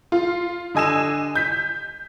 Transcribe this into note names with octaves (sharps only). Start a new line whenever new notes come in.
F4
D3 D#5 G#5 E6 E7
G6 B6